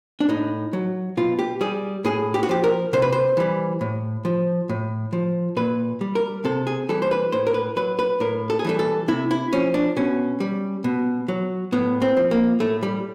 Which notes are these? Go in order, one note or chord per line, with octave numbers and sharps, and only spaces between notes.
D4
A2 D#4
F#3
B2 F4
G4
G3 G#4
A2 G#4
G4
F#4
F3 G4
A#4
C3 C5
B4
C5
E3 G3
A2
F3
A2
F3
A#2 B4
G3
A#4
C3 A4
G#4
E3 G3 A4
C5
B4
A2 C5
A#4
B4
F#3 B4
B4
A2 A#4
A4
G#4
E3 G3 A4
A4
C3 E4
E4
F3 C#4
D4
B2 C#4
G3
B2
F#3
A2 B3
C4
F3
A#3
A2 A3
G3